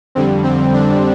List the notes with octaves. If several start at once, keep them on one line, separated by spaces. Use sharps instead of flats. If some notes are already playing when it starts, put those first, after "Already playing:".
F2 D3 G3 C4
C4
D4